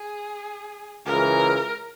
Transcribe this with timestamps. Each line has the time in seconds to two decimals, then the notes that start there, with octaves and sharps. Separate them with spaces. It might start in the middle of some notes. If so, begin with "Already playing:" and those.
Already playing: G#4
1.05 C#2 C#3 E3 A#4